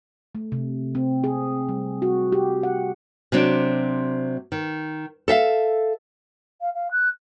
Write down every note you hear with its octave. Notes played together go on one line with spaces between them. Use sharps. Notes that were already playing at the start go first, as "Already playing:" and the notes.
A3
C3
C4
G#4
G3
F#4
G4
F#5
C3 F#3 C4 D4
D#3
A4 E5 F5
F5
F5
F#6